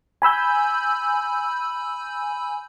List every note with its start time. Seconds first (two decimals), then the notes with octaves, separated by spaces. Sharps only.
0.22 G#5 B5 E6 G6